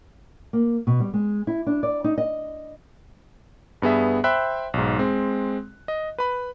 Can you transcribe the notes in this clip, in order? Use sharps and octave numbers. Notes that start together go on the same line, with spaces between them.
A#3
B2
G3
G#3
E4
D4
D5
D#4
D#5
G2 B3 G#4 E5
C5 E5 G5 B5 F#6
B1 G#2
G#3 C4
D#5
B4 B5